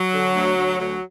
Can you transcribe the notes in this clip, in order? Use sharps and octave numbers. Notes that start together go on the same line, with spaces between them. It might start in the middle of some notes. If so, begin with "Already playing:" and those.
Already playing: F#3
D3
D2
D2
D2 F#3